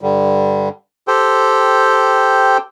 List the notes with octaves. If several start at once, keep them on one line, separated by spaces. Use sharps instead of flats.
G2 D3 G3
G4 A4 C5 G5